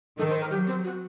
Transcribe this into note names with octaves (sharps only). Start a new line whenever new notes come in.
D#3 A4
C5
A#4
F#3 G4
C4
F#4